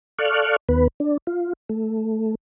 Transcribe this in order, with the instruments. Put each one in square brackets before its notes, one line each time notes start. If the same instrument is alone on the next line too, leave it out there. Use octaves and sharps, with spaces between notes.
[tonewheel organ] A4 D5 F5 C#6 F6 F#6
D#2 B3 B4
D4
F4
A3